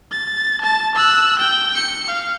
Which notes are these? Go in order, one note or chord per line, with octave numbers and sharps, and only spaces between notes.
A6
A5 A6
E6 F#6
G5
C#7
F5